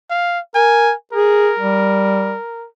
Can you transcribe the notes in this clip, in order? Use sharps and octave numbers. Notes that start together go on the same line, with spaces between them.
F5
A#4 G#5
G#4 A#4
G3